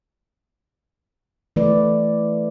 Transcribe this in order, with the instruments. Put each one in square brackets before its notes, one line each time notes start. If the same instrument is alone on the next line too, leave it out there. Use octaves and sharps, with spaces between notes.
[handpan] E3 A3 E4 B4 D5